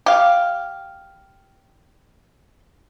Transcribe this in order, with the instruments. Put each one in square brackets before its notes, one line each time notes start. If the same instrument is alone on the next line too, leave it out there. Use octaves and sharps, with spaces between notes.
[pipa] G4 F5